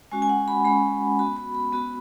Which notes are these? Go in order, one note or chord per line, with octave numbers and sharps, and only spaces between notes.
G#3 C#4 F#4 G#5
G#5
F#5
B5
G#3 C#4 F#4 B5
B3 F#4 B5
B5
B5
B3 F#4 B5